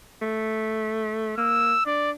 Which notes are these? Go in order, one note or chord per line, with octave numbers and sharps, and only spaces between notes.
A3
A#3 E6
D4 D5